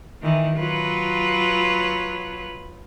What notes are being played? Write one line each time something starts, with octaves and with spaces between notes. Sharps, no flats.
D#3 E3
F#3 F4 B4